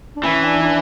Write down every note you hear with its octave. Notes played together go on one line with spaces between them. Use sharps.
D4
E3 C#4
D4
E4
D4